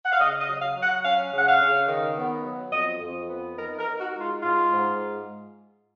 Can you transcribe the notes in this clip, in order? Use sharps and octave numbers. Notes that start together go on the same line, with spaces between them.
F#5
F5
C#3 D#5
D#5
F#3
F5
F#3
F#5
C#4 F5
C#3 F#5
F5
C#3
D#3
B3
F#3
F2 D#5
F2
B3
D#4 A#4
A#4
D#4
F#4
G#3
F4
G#2 F4
G#2